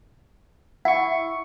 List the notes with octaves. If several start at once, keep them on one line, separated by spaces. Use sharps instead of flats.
E4 F#5 C#6